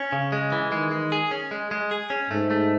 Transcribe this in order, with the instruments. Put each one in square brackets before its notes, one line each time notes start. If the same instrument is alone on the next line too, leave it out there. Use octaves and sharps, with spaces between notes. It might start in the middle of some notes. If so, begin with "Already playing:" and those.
Already playing: [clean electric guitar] C#4
C#3
G#3
E3
[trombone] D#3 [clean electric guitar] G#3
[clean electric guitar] G#3
G#4
C#4
G#3
G#3
G#4
C#4
[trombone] G#2 [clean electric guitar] A3
[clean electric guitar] A3